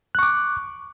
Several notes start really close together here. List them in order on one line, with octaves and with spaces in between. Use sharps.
F#6 C#6 D6